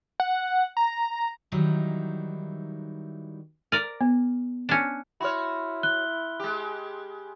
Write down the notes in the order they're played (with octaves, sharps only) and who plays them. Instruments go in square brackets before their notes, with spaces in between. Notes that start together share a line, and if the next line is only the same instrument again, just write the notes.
[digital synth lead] F#5
A#5
[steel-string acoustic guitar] D#3 E3 F#3 G3 D#4 E4
[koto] A#4 D5
[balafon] B3
[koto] C#4 D4
[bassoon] E4 [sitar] F#4 C#5 [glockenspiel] B5 C6 F6
[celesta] F#6 [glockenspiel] G7
[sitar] G#3 G4